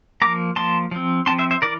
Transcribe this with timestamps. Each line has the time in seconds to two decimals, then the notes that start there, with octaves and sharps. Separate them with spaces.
0.22 F3 A#3 A#5 D6
0.56 F3 A#3 A5 C6
0.91 F3 C4
1.26 F3 C4 A5 C6
1.38 C5 E5
1.51 C5 E5
1.62 E3 A#4 D5